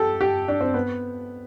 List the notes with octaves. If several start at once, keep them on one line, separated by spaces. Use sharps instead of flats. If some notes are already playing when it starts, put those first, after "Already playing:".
Already playing: G4 A4
G4
D4
C4
B3